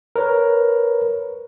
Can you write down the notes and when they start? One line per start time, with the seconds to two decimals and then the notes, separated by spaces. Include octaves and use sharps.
0.16 A#4 B4 C#5